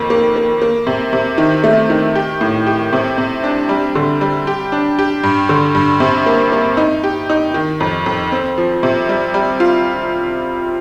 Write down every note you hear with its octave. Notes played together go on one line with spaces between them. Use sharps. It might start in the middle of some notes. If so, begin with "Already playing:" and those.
Already playing: F2 D#3 A#3
A#3
A#3
A#3
C3
C3
D#3
A3
D#3
G4
A2
G4
C3
C3
D4
G3
D3
G3
G4
D4
G4
G2
D3
G2
C3
A#3
A#3
D#4
G4
D#4
D#3
F2
F2
C4
F3
C3
G3
G3
F4